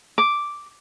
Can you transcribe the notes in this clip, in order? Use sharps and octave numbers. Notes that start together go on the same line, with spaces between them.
D6